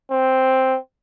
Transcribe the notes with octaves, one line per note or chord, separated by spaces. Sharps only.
C4